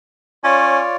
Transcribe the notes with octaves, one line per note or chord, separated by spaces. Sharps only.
C#4 F4 C#5 D5